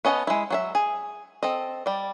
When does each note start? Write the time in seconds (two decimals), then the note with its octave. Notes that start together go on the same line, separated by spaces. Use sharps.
0.05 B3 C#4 D#5 F5 A5
0.27 G#3 E4
0.50 F#3 G#4 E5
0.75 G#4
1.43 C4 A4 D#5
1.86 G3 D5